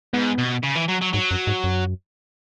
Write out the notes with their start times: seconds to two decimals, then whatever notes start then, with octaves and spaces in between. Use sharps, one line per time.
0.13 G#2 B3
0.38 B2
0.64 C#3
0.76 E3
0.89 F#3
1.02 F#3
1.13 G#2 F#3
1.31 F#2
1.47 G#2
1.64 F#2